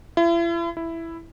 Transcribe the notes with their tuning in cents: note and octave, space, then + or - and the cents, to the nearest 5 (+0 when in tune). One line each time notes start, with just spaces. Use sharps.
E4 +40
E4 +5